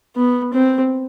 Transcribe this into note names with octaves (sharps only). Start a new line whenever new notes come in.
B3
C4